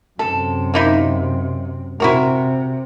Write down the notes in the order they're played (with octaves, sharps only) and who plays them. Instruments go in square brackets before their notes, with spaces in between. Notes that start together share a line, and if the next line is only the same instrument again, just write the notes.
[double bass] F#2 C3 [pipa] A4
[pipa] A#3 D#4 E4
[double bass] C3 [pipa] E4 F#4 A#4